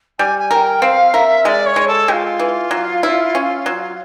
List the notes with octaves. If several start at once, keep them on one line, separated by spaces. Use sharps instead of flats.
G3 G#5
G#5
A#4 G5 G#5
C4 F5
A#4 E5
G#3 D5 D#5
C#5
G#3
A4
G#3 F4 G4
E3
F#3
E4
C#4
F#3